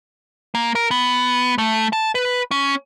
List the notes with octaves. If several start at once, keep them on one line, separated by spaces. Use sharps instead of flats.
A#3
A#4
B3
A3
A5
B4
C#4